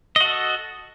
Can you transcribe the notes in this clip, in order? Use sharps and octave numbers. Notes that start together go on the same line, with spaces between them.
F#4 A4 D#5